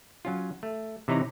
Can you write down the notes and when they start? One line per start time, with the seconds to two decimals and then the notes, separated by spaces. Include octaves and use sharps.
0.25 F#3 C#4 F4
0.63 A3
1.08 C3 E3 D#4 B4 C#5 A#5